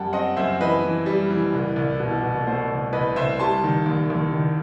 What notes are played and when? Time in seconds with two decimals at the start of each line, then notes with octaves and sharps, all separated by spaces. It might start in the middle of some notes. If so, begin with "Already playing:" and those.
Already playing: F#2 G3 F#5 G5 A5
0.13 C4 D#5 F#5
0.37 F#2 C5 E5
0.60 E3 B4 D#5
0.84 E3
1.06 G3
1.30 E3
1.54 C2
1.76 C2
2.00 B2
2.24 B2
2.46 A3 C5
2.70 C2
2.93 C2 B4 D#5
3.16 C2 C5 E5
3.40 G3 A5 C6
3.64 D#3
3.86 D#2
4.10 D#2
4.33 D#3